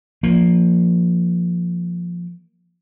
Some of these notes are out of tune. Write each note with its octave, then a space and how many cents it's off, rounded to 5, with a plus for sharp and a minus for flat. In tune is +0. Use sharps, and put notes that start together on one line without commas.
F3 +0 A#3 +0